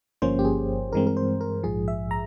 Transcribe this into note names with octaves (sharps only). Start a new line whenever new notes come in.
G1 G2 F3 A#3 C#4 C5
G4
G#4
G2 E3 G#3 C4 A#4
A#4
C5
A#4
A#1 G#2 F3 G#4
E5
A#5